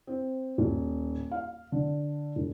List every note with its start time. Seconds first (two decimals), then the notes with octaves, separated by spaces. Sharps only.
0.07 C4
0.58 D#1
1.31 F5
1.72 D3
2.36 E1